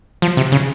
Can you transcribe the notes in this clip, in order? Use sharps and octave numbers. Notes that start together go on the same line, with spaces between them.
F3
C3
C#3